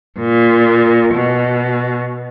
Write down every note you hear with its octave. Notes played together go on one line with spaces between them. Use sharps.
A#2
B2